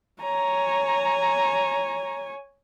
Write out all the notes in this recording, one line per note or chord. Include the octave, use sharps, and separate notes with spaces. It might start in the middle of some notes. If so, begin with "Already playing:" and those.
C#5 G#5 A#5